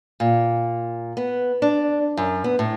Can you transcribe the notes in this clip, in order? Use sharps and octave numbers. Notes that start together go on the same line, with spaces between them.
A#2
B3
D4
F#2
B3
A2